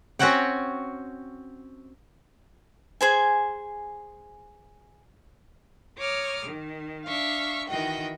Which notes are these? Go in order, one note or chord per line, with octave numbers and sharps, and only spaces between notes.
C4 C#4 F#4 C#5 F#5 G5
G#4 C5 G#5
C#5 A#5 D6 D#6 F6
D#3
D4 E5 F5 C#6
D#3 E3 F#4 D#5 G5